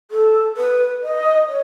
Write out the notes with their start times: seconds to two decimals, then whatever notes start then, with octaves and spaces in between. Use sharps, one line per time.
0.11 A4
0.57 B4
1.02 D#5
1.47 C#5